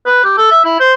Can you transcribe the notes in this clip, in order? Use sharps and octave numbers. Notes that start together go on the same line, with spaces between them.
B4
G4
A4
E5
E4
C5